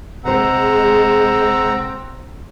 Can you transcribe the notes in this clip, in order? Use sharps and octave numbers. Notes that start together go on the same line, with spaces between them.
C3 G#3 C4 C5 F#5 A#5 E6